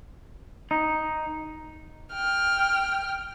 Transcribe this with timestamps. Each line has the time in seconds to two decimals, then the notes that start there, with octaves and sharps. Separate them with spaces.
0.71 D#4
2.13 G5 F6